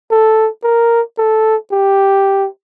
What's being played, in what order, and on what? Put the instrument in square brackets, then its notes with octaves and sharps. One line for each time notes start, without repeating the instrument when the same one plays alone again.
[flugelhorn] A4
A#4
A4
G4